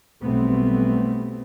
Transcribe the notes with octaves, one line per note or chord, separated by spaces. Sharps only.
B1 G3 A3 B3 C4